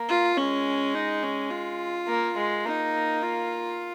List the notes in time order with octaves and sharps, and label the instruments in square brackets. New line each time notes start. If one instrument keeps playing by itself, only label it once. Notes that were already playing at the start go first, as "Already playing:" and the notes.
Already playing: [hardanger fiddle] A#3
[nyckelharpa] F4
[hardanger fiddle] G#3 [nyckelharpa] C#4
[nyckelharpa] D#4
C#4
F4
[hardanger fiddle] A#3
G#3
[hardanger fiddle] A#3 [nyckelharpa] D#4
[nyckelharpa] F4